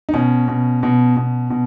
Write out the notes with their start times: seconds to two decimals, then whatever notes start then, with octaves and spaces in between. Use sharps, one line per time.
0.09 D#4
0.13 B2 C#4
0.48 B2
0.83 B2
1.17 B2
1.50 B2